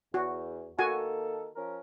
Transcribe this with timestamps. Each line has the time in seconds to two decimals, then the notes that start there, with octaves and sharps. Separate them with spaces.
0.14 E2 F#4
0.79 D#3 A#3 F#4 A4 F#5 G#5
1.56 F3 C#4 A#4